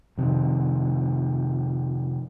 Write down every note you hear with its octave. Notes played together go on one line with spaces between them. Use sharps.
F2 C3 D#3